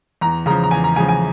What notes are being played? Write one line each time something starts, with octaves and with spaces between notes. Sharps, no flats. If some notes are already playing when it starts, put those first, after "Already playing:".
E2 A#5
C#3 F3 A#5
A#5
E2 G#5
A#5
C#3 F3 G#5
G#5